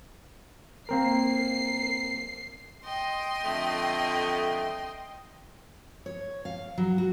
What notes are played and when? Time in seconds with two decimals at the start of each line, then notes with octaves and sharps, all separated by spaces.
0.89 A#3 C4 A#4 C7
2.84 D#5 G5 C6
3.44 F2 D3 A3
6.06 C#5
6.45 F5
6.78 F#3
6.98 F#4